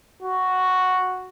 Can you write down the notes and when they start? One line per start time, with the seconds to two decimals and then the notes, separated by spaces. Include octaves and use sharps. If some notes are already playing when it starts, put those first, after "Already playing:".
0.22 F#4